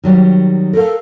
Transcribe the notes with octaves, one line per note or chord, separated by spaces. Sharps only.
D#3 F#3 G3
A4 A#4 F5